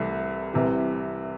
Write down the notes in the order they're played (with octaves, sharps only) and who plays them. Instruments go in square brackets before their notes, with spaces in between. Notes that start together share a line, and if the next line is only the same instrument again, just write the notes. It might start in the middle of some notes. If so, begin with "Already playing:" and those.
Already playing: [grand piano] C2 C3 E3 A3
C2 C3 E3